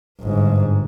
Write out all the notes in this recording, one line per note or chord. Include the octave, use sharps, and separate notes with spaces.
G1 G#2